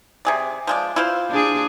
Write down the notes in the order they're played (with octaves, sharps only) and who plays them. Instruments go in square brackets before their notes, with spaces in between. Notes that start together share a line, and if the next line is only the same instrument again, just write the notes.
[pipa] C3 G#4 D5
F3 G#3 D5
E4 F4 C5
[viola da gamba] D4 G#4